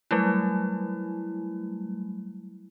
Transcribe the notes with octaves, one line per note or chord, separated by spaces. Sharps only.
F#3 G3 A3 E4